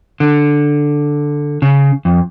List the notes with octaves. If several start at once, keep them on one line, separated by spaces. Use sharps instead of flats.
D3
C#3
F2